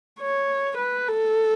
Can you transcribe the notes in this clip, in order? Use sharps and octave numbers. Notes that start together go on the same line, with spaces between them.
C#5
B4
A4